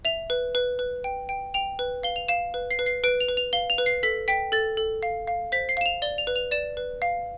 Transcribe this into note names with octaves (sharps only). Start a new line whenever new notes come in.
E5 F7
B4
B4
B4
G5
G5
G5 F7
B4
F5 G7
F7
F5 E7
B4
C7
B4
C7
B4 D7
F7
B4
F7
F5 G7
F7
B4
C7
A4 B6
G5 B6
A4 A6
A4
F5
F5
C5 B6
C7
F5 E7
F7
D5 G7
F7
B4
F7
D5 E7
B4
F5